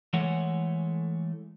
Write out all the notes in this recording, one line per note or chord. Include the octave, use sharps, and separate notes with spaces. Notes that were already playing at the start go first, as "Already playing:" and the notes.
E3 G#3 A3 C#5 F#5